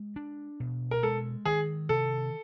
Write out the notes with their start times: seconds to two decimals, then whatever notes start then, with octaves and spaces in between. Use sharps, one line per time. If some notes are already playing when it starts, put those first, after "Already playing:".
Already playing: G#3
0.16 D4
0.60 B2
0.91 A#4
1.03 G#3 A4
1.45 D#3 G#4
1.89 C3 A4